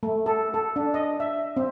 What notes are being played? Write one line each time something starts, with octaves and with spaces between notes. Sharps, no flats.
A3
A4
A4
D4
D#5
E5
C4